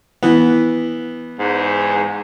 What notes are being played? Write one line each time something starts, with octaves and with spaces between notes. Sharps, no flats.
E3 B3
E2 G#2